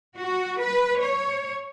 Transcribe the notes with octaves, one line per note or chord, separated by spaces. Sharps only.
F#4
B4
C#5